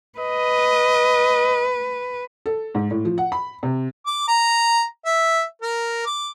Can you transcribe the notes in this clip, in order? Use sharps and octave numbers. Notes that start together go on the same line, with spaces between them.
B4 D#5
A4
G#2
A2
F3
F#5
B5
C3
D6
A#5
E5
A#4
D6